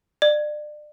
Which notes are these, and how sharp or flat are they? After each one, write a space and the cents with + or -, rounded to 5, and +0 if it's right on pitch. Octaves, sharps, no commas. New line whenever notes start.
D5 +30